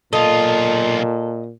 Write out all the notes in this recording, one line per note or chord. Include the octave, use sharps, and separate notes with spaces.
B1 A#2 F4 A4 D#5